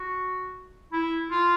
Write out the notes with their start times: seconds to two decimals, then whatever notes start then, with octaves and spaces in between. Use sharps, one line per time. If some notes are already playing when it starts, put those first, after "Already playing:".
Already playing: F#4
0.93 E4
1.31 F4